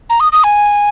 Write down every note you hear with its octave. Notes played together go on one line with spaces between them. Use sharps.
A#5
D#6
D#6
G#5